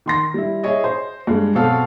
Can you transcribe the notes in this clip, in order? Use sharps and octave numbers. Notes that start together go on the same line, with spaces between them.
D#3 C6 A#6
G3 E4
G#4 C#5 D#5 E5
C5
G2 G#3
B2 F#3 C4 A4 F5 F6